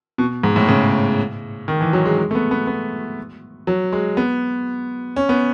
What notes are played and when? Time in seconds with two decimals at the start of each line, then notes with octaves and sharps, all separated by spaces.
0.18 B2
0.44 G#2
0.56 A2
0.68 C#3
1.68 D#3
1.81 E3
1.93 F#3
2.05 G#3
2.18 G#3
2.31 A3
2.35 B3
2.51 B3
2.67 B3
3.67 F#3
3.93 G#3
4.17 B3
5.16 C#4
5.29 B3